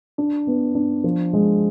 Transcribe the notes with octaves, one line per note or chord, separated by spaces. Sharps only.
D4
B3
D4
F3
G#3